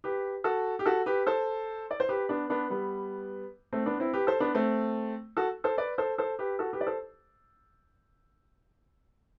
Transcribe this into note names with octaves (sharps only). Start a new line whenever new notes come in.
G4 B4
F#4 A4
G4
F#4 A4
G4 B4
A4 C5
D5
C5
G4 B4
B3 D4
B3 D4
G3 B3
A3 C4
B3 D4
C4 E4
G4 B4
A4 C5
B3 D4
A3 C4
F#4 A4
A4 C5
B4 D5
A4 C5
A4 C5
G4 B4
F#4 A4
G4 B4
D5
A4 C5